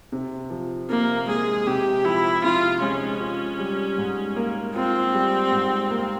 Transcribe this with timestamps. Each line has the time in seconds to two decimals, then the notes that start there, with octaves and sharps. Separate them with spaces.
0.12 C3
0.50 F3
0.89 C3 A#3
1.28 G#3 G#4
1.66 C3 G4
2.04 F3 E4
2.43 C3 F4
2.82 G#3 C#4
3.20 F4
3.59 G3
3.98 G#2
4.36 A#3
4.75 C4 F4
5.14 G3
5.52 G#2
5.90 A#3